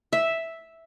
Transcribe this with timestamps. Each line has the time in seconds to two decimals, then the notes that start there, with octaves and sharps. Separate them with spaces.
0.13 E5